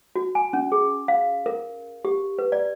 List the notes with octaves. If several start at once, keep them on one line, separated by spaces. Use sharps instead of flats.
F#4
G#5
C#4
G#4
F5
A#4
G4
B4
D5